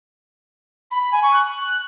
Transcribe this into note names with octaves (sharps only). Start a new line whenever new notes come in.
B5
B5
G#5
C#6
F#6